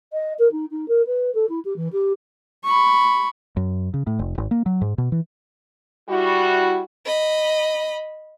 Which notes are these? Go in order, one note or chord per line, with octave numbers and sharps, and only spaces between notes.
D#5
A#4
D#4
D#4
A#4
B4
A4
E4
G4
E3
G4
B5 C#6
F#2
C#3
A2
F1
G#1
A#3
F#3
G#2
B2
E3
G3 E4 F#4
D#5 B5